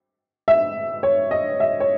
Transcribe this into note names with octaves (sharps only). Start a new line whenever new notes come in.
E5
C#5
D#5
E5
C#5